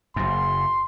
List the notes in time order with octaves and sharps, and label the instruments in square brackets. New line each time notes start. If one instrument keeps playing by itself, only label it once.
[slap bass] F#1 F#2 [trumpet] C6